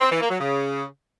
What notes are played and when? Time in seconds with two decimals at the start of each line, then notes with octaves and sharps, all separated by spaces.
0.01 C4
0.11 E3
0.21 A#3
0.30 F#3
0.40 C#3